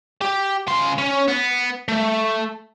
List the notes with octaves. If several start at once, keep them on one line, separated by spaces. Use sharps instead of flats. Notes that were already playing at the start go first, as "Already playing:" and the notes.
G4
C#3 C6
C#4
B3
A3